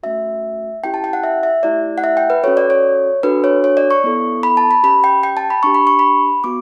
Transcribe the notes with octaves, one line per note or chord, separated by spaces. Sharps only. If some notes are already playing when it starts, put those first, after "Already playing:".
A3 C#4 F#4 E5
C#4 E4 G4 G5
A5
G5
F#5
E5
E5
A3 E4 G4 D5
F#5
E5
G5
B4
C#4 F#4 A4 C#5
D5
C#5
D4 F#4 A4 B4
C#5
C#5
D5
C#6
B3 E4 A4
B5
A5
B5
C#4 G4 B5
G5
G5
A5
B5
D4 G4 C#6
B5
C#6
B5
B3 F#4 D6